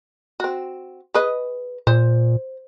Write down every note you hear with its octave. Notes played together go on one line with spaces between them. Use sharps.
C4 F#4
G#4 B4 D#5
A#2 C5